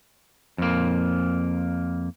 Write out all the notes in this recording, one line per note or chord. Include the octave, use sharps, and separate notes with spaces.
F2 A#3